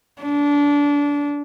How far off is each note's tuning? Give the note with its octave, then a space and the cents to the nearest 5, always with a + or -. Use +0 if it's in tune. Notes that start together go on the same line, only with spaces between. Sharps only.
D4 -25